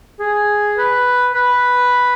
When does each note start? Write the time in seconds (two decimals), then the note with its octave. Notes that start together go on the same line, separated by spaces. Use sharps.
0.19 G#4
0.78 B4
1.34 B4